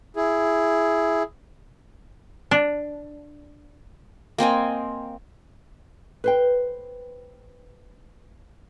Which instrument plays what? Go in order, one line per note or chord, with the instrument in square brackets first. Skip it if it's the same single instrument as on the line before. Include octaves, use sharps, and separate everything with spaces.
[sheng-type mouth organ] E4 G#4
[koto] D4
[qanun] A#3 C4 D#5 G#5
[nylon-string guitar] B4 C5 G5